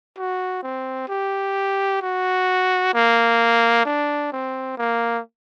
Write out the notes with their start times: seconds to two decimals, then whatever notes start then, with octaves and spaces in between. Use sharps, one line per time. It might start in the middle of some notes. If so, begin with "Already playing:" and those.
0.17 F#4
0.63 C4
1.08 G4
2.02 F#4
2.94 A#3
3.85 D4
4.32 C4
4.77 A#3